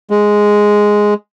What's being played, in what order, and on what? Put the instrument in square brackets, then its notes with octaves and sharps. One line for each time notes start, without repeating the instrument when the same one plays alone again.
[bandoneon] G#3